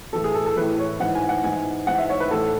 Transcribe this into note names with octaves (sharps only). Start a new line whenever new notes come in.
A2 E3 A4
G#4
A4
A4
A2 E3 B4
C#5
G#2 E3 F#5
G#5
F#5
G#2 E3 G#5
G#2 E3 F#5
E5
C#5
B4
A2 E3 A4